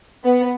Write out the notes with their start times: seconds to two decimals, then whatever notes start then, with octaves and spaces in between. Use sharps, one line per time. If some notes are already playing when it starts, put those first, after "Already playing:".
0.24 B3